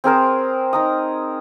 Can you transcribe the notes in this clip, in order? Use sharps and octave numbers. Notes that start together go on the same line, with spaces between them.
C4 G#4 A#4 C5
D#4 A#5 D#6